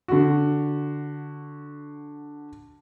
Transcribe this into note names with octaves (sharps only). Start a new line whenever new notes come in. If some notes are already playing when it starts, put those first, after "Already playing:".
D3 F#4